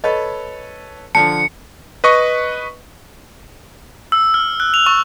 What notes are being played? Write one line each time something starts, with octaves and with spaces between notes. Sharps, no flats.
A4 B4 C#5 D#5
D3 F3 A5 C#7
B4 D#5 C#6
E6
F6
F#6
F7
C#6